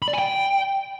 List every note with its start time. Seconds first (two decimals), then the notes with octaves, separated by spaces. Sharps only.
0.02 B5
0.08 D5
0.13 G#5
0.19 G5